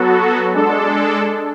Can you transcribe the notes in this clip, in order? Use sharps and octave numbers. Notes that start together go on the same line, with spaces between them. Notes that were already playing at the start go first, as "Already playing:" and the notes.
Already playing: F#3 B3 F#4 A4
G#3 D4 A4